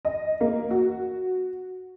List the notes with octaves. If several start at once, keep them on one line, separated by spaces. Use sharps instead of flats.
D#5
A#3
F#4